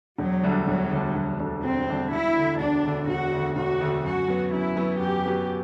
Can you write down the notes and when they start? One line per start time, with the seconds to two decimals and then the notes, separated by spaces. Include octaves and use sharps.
0.18 E1 F#3
0.43 D2 D3 G3 D4
0.67 E1 F#3
0.91 D2 D3 G3 D4
1.15 E1
1.39 D2 D3 G3 D4
1.63 E1 C4
1.87 D2 D3 G3 D4
2.12 E1 E4
2.36 D2 D3
2.60 E1 D4
2.84 D2 D3
3.07 E1 F#4
3.32 D2 D3
3.56 E1 F#4
3.81 D2 D3
4.04 F#2 F#4
4.28 F#3 B3
4.53 F#2 E4
4.76 F#3 B3
5.00 F#2 G4
5.25 F#3 B3